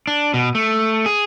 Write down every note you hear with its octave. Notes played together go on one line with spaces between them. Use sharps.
D4
B2
A3
G#4